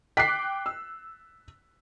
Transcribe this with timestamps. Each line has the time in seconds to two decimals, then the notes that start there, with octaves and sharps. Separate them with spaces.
0.17 G5 D6 F#6 B6 C7
0.66 E6